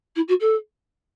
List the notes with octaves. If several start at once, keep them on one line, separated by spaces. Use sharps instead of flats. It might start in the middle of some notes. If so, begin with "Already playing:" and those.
E4
F#4
A4